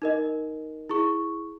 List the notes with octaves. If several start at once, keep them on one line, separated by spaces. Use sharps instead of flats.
D#4 A#4 D#5
E4 G#4 C#6